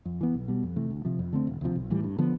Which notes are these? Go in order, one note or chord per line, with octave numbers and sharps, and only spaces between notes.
F2
E3 B3
B1
B2 G3
F2
C3 E3 A3
D2
C3 F3
F2
D3 A3 C4
E1
D2 C3 F3
B1
A2 E3 G3
G2
D3 F3 B3